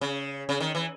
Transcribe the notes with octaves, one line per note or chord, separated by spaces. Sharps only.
C#3
C#3
D#3
E3